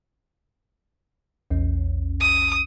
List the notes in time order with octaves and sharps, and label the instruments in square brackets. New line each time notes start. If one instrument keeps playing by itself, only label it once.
[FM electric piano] A#1 E2 C#4
[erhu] D#6